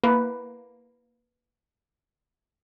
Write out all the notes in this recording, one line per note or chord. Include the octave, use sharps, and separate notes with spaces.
A#3 B4